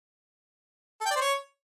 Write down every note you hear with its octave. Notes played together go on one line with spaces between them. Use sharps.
A4
G5
D5
C5
C#5